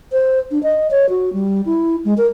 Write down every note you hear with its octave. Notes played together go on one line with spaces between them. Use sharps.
C5
D4
D#5
C#5
F#4
G3
E4
G#3
A#4